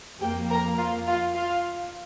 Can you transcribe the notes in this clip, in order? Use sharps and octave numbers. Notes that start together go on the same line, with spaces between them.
F2 F3 A#3 G4 G5
A#4 A#5
F4 F5
F4 F5
F4 F5